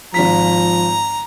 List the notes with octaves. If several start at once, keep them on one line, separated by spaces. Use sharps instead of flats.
G#1 F3 F4 A#5 B6